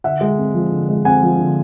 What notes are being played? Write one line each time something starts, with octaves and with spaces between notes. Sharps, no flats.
D3 E5 F#5
G#3
C4
F3
D3
G#3
C4 F#5 G#5
F3
D3